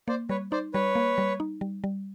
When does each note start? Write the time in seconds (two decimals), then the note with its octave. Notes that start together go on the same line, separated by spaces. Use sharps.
0.08 A#3 C5 D5
0.29 G3 B4 C#5
0.52 D#4 C5 D5
0.74 G3 B4 C#5
0.95 A#3
1.18 G3
1.40 D#4
1.61 G3
1.84 G3